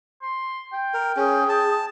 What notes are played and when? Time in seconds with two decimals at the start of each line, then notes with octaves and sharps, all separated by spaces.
0.22 C6
0.73 G5
0.94 A#4
1.17 C#4 G#4
1.49 A5